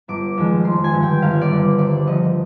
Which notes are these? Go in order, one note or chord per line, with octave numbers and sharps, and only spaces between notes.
G1 D6
F2 D#3 G#3
G1 C6
G#5
G2 D3
G5
G1 F5
D5
G2 D3
D2 D5
D3 F3 D#5